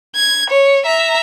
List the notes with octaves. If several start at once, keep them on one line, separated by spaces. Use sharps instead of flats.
G#6
C#5
E5 A#5